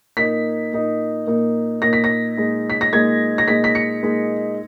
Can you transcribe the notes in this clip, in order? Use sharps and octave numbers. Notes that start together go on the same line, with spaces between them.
A#2 A#3 D#4 B6
A#2 A#3 D#4
A#2 A#3 D#4
A#2 A#3 D#4 A#6
B6
A#6
A#2 G#3 D#4
B6
A#6
A#2 G#3 D#4 G#6
A#6
A#2 G#3 D#4 B6
B6
C#7
A#2 G#3 D#4